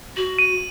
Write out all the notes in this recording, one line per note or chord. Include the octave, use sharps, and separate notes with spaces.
F#4 F#7
D#7